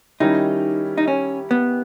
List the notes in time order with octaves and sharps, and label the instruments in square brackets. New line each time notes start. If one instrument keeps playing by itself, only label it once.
[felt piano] D#3 G3 C#4 E4 [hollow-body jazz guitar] D#4
[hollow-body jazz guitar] D#4
C#4
B3